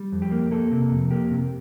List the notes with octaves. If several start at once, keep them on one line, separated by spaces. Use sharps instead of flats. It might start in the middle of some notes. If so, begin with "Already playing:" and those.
Already playing: G3
F2
G4
A#3
A#3 A4
C3
F2
A#3 G4
C3